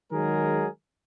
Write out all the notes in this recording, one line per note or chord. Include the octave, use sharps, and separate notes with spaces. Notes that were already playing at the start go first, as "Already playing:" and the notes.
D#3 F#3 G#3 G#4 A#4